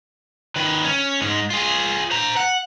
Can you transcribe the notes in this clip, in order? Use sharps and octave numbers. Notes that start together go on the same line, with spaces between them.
D#3 B4
C#4
G#2 G#3
F4 G#4
C5 A#5
F#5